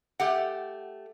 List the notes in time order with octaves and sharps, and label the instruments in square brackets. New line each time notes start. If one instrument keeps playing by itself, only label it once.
[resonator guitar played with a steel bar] A3 G4 F#5